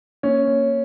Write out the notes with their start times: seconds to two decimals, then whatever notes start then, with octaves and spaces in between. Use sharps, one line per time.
0.23 A#3 C#4
0.47 A#3